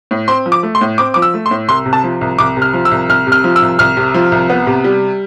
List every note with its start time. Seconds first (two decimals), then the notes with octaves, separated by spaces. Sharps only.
0.11 A2
0.28 C4 C6
0.46 F3
0.52 D6
0.63 A3
0.75 C6
0.81 A2
0.98 C4 D6
1.14 F3 D6
1.22 E6
1.34 A3
1.46 C6
1.51 A2
1.68 C2 C6
1.86 C3
1.93 A5
2.04 F3
2.21 C2
2.39 C2 D6
2.57 C3
2.62 F6
2.74 F3
2.85 E6
2.91 C2
3.09 C2 F6
3.27 C3
3.32 F6
3.44 F3
3.56 E6
3.62 C2
3.79 C2 F6
3.97 C3
4.14 F3
4.32 C2
4.50 B3
4.67 C3
4.84 G3